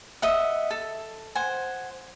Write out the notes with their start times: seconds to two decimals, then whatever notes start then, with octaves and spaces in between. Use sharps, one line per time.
0.22 D#5 E5 F#5
0.70 A4
1.35 C5 F#5 G#5